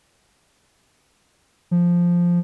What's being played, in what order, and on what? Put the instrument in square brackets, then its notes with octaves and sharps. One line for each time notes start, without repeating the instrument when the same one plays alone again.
[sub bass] F3